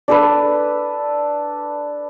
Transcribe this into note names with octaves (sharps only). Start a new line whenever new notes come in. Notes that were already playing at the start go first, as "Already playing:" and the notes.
D4 A4 B4